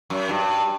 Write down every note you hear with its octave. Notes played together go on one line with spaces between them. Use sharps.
F#2
G2